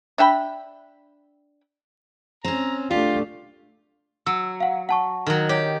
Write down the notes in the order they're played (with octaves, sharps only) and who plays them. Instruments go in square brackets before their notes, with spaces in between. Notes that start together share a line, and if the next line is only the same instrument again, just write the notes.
[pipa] D4 E5 G5 B5
[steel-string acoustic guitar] C4 C#4 [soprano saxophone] A#5
[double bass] A3 D4 [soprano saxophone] F4 [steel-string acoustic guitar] G4
[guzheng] F#3 [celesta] E6
[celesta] F5 F#5
F#5 A5 C#6
[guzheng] D#3 F#3
[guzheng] G4 [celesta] C#5